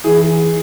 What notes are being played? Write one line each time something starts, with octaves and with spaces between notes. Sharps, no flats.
E3 G#4